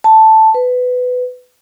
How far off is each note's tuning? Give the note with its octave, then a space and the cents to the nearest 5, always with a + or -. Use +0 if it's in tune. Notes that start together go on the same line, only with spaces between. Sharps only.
A5 +0
B4 +15